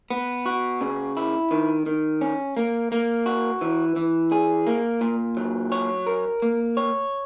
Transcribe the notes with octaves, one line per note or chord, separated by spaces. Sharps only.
B3
F#4
C#3
E4
D#3
D#3
C#4
A#3
A#3
F#4
E3
E3
G#4
A#3
A#2
F#3
C#5
A#4
A#3
C#5